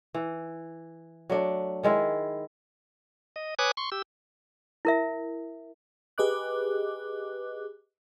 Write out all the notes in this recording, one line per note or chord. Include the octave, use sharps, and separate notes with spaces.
E3
F#3 A3 D4
D#3 G#3 E4
D#5
B4 C#5 G#5 D6 D#6 F#6
C6 C#6
G4 E6
E4 A#4 E5
G4 G#4 B4 D#5 D6 F#6